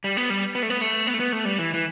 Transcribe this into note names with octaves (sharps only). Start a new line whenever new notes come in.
G3
B3
G3
B3
A3
B3
A3
B3
A3
B3
A3
G3
E3
E3